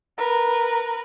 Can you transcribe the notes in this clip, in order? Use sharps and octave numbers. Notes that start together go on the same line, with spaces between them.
A#4 B4